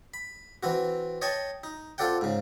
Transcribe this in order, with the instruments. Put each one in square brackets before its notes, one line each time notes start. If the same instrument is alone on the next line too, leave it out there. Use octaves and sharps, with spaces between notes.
[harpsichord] B5
E3 C4 F#4
C#5 D#5 G5 A5 C#6
D#4
C4 F4 A4 D5 F#5 G5
G#2 C#3